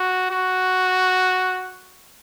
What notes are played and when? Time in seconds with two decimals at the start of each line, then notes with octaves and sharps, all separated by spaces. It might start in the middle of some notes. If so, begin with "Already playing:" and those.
Already playing: F#4
0.31 F#4